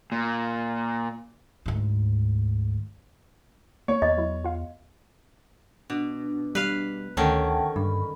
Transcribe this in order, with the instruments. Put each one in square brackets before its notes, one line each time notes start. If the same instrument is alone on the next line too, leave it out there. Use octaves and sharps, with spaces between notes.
[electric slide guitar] A#2
[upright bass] D2 G#2
[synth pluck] A#3 [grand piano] C#5
[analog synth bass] E2 [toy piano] D#5
[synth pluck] F#3 E4
F4 F5
[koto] B2 [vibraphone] D4
[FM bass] G3 [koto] B4 F5
[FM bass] D2 [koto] D3 D#3 C#4 [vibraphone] F#5 G5 A5
[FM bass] G2 [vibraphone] B5